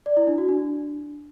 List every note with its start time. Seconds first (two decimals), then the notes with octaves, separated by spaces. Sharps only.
0.06 D5
0.17 E4
0.27 D4
0.38 F#4
0.49 D4